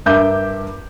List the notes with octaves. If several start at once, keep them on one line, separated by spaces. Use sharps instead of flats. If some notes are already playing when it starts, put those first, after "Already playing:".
G2 A#4 E5 D6 G6